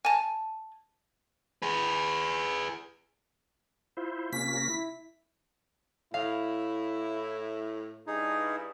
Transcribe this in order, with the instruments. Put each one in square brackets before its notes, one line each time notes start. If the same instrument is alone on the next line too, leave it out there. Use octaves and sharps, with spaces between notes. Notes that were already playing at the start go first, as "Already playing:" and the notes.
[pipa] G#5 A5
[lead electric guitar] G#4 B4
[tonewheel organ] E4 C5 [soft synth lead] F4
[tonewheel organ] C3 A#3 C#4 [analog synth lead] B6
[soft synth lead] A#6
E4
[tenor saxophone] A2 [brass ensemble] E4 [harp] F5
[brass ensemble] G2 E4 [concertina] D#4 G#4